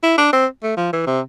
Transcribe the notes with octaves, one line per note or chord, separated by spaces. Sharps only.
E4
D4
C4
A3
F3
E3
C3